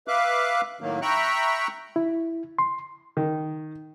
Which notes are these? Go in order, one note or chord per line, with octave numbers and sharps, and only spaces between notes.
B4 E5 F5 D6 F#6
A2 D#3 F#3 A#3
E5 G5 A#5 B5 C#6 F#6
E4
C6
D#3